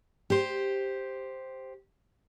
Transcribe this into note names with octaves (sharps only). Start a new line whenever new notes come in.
G4 C5